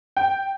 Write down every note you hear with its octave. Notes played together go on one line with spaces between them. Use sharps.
G5